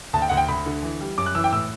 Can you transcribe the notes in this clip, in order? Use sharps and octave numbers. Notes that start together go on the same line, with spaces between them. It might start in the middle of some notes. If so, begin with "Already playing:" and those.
D2 A5
G5
D2 F#5
G5
D2 B5
D3
E3
G3
F#2 D6
F#6
E3 E6
G5
A2 E6